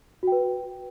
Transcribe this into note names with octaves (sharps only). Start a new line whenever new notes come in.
F#4 B4 G5